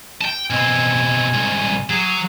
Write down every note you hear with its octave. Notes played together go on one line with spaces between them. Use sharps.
G5 A5
B2 C4 G#5
C2 G#2
F#3 G#4